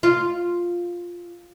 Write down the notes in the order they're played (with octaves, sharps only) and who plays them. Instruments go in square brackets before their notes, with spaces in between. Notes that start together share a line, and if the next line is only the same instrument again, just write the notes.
[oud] F4